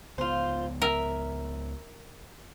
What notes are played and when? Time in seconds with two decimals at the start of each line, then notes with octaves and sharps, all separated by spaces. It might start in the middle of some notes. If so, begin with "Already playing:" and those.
0.18 C#2 B3 F4 C5
0.82 A#4 E5